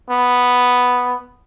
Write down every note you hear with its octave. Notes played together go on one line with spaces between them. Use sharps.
B3